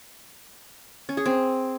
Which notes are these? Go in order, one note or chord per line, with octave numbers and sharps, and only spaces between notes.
C#4
G#4
C4